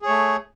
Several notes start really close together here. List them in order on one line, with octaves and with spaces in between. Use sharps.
G#4 C#5 A3